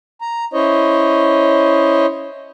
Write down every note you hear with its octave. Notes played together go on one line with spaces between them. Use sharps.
A#5
C#4 E4 C5 C#5 D#5